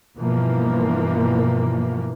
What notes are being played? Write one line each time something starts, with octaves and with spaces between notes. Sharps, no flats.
G2 B2 E3 F3 A#3